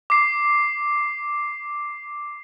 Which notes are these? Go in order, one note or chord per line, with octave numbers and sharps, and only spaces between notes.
D6 C7